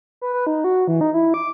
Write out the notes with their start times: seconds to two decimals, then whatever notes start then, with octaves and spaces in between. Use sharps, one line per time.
0.22 B4
0.33 B4
0.47 D#4
0.64 F#4
0.87 E3
1.01 D#4
1.14 E4
1.34 D6